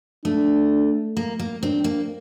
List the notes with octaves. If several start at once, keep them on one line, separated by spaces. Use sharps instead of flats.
A3 D4
A#3
A#3
C4 D4
A#3